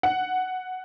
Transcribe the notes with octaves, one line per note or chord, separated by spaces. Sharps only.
F#5